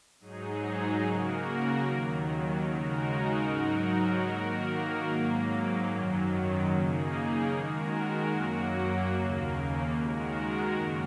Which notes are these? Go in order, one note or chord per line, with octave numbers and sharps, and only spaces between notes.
G#2 F#3 D#4 G#4
C#3 A#3 F#4 A#4
D#2 D#3 F#3
C#3 G#3 D#4 F#4 A#4
G#2 F#3 D#4 F#4 A#4
D#3 A#3 F#4 A#4
G#2 F#3 A#3
F#2 D#3 F#3
C#3 A#3 D#4 G#4
D#3 G#3 F#4 A#4
F#2 F#3 A#3 F#4
D#2 C#3 A#3
D#3 G#3 F#4 A#4
F#2 C#3 A#3